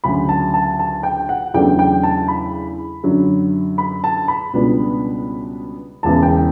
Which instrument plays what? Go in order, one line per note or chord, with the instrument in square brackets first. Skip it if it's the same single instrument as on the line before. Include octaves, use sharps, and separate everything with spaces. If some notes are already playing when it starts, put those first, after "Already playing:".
[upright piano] D2 C#3 F#3 B5
A5
A5
A5
G5
F#5
E2 C#3 F#3 A3 D4 G5
G5
A5
B5
F#2 D3 F#3
B5
A5
B5
C#2 B2 G3 B3 D4
E1 E2 C#3 A5
G5